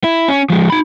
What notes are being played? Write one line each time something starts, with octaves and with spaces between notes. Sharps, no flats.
E4
C#4
F3 G#3
D#4 B5